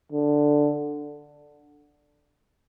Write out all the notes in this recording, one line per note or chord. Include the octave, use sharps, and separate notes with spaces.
D3